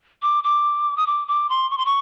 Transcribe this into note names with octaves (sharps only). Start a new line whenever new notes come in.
D6
D6
D#6
D6
D6
C6
C#6
C6
C#6